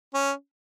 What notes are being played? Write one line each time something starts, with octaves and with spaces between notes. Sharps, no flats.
C#4